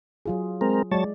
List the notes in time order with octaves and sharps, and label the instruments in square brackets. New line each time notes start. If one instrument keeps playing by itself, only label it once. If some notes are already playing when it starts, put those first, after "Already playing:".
[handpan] F#3 F4 G#4
[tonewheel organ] G#3 C4 A#4
[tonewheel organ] F#3 C#5 A5 [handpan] G#3 D5